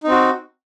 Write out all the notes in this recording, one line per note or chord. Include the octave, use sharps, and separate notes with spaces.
C4 D#4 F#4